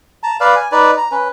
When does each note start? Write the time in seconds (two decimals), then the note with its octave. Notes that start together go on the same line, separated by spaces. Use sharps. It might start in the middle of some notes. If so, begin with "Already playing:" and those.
0.23 A5 A#5
0.40 B4 D5 F5
0.56 G#5
0.72 D#4 B4 D5
0.97 A#5
1.12 C#4 B4